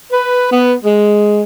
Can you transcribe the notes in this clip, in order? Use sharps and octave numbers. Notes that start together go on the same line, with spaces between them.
B4
B3
G#3